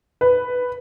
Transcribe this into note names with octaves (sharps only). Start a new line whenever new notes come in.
B4